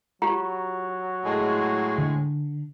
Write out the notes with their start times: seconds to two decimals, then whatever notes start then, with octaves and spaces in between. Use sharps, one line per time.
0.22 F#3 F4 G4 A#5
1.24 A2 G#3
1.98 D3